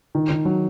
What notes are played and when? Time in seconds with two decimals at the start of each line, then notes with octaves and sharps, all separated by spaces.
0.15 D#3
0.30 D#3
0.45 F#3